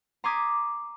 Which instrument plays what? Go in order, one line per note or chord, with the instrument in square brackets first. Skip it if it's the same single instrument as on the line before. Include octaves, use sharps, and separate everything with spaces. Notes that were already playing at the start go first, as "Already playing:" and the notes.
[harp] A#5 C6 D6 D#6 G#6 B6